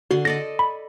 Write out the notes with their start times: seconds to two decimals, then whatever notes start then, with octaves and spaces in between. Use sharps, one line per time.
0.11 D3 F#4 C6
0.25 A4 D5 D#5 A#6
0.59 B5